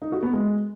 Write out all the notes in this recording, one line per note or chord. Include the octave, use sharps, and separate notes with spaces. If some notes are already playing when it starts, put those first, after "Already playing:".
D#4
F#4
B3
G#3